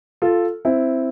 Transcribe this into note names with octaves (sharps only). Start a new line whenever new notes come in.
F4 A4
C4 E4